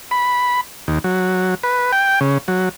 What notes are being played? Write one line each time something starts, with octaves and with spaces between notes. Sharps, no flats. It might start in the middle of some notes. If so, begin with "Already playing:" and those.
B5
D#2
F#3
B4
G5
C#3
F#3